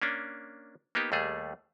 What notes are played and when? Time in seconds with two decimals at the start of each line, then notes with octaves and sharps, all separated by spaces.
0.02 A#3 C#4 D4
0.95 A#3 B3 D#4 G4
1.12 D#2 G3 A3 G#4